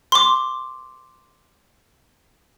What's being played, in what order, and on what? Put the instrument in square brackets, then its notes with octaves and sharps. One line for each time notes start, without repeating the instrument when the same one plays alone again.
[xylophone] C6 D6